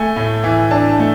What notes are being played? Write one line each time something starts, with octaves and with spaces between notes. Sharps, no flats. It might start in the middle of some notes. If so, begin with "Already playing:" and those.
Already playing: A3 G#5
A2
E3
D4 A5
A3